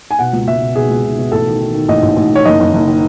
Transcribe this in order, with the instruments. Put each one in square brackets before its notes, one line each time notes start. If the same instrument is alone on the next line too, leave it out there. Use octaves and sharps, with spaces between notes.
[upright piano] G#5
B2 F#5
C#2
C#2 E5
B2
B2 G#4
C#2
B2
B2
A1 A4
D#3
D#3
D#3
A1 D#5
A1
A1
D#3 C#5
F#1 D#5
F#1
F#1
D#3